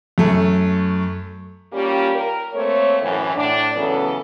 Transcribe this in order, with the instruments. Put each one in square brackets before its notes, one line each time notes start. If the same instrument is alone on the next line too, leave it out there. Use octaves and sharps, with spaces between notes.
[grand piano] F#2 A3 A4
[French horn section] G3 A#3 C#4 F4 G4
A#4
A3 A#3 C4 C#5
F#2 A2 E3
A2 D4
C#3 E3 F#3 B3 C#4 A4